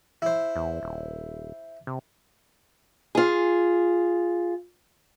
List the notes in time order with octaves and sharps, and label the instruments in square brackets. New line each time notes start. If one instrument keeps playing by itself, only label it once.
[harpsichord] E4 C5
[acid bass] E2
D#1
C3
[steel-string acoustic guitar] F4 G#4